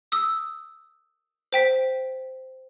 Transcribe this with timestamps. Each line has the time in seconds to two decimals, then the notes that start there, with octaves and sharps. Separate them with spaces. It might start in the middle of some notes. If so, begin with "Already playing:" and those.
0.12 D#6 E6
1.53 C5 G5 B6